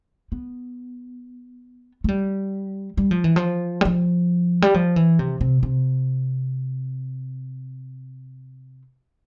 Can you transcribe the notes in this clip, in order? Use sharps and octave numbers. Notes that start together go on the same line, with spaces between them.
B3
A3
G3
G3
F3
E3
F3
G3
F3
G3
F3
E3
C3
C3
C3